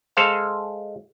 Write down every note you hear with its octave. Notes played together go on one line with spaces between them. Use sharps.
G#3 A4 C5 F5